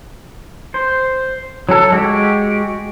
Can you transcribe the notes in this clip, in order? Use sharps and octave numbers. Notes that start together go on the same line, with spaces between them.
C5
F#3 A4
G#3 F#4 G4